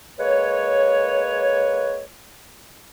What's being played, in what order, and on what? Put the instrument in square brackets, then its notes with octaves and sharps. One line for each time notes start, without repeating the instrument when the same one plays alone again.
[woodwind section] G#3 A#3 B4 C#5